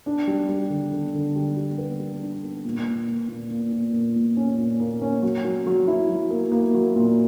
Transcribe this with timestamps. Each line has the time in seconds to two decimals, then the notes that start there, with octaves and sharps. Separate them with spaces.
0.06 D4
0.27 G3
0.49 G3
0.70 D3
0.92 D3
1.14 D3
1.35 G3
1.57 G3
1.78 B3
2.00 G3
2.22 D4
2.43 B3
2.65 A#2
2.87 A#2
3.08 A#2
3.29 A#2
3.51 A#2
3.73 A#2
3.93 A#2
4.16 A#2
4.37 C#4
4.58 A#2
4.80 A#3
5.01 C#4
5.22 F#3
5.45 F#3
5.67 F#3
5.87 E4
6.10 F#3
6.30 A#3
6.52 A#3
6.74 F#3
6.96 A#2